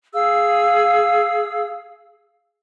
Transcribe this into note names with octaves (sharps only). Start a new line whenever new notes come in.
G#4 F5 E6